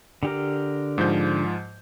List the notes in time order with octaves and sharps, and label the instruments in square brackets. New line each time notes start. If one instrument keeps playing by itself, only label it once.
[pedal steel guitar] D3 G4 A#4
[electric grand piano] G#2 F3 G6